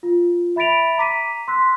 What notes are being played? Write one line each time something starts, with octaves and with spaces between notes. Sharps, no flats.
F4
E5 B5 A6 B6 D7 F7
A#5 D6 B6 D#7
C6 E6 F#6 B6